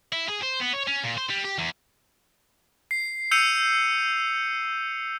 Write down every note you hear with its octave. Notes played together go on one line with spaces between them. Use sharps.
E4
G#4
C5
B3
C#5
C#4
A#2
C5
G3
G4
E2
C7
E6 G6 C7 C#7 D#7 F7